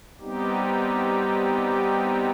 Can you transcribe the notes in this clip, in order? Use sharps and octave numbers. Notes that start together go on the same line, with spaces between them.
G3 B3 C4 D#4 G4